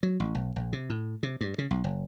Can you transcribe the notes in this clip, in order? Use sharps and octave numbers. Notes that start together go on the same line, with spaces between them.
F#3
A1
B1
A#1
C3
A2
C3
G2
C#3
B1
F#1